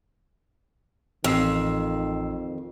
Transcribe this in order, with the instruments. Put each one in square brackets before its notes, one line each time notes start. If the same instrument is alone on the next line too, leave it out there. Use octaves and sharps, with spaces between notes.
[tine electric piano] A1 E6 C7 [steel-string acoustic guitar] F2 [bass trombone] D#3